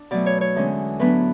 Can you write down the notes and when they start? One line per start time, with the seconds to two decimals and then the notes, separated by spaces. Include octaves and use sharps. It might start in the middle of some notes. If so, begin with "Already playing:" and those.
Already playing: D4
0.11 B2 F#3 A3 D5
0.26 C#5
0.41 C#5
0.55 E2 D3 G#3 C#4
0.99 A2 F#3 B3 D4 B4